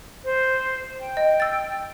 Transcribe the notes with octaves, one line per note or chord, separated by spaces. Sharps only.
C5
G5
D#5
E6 A6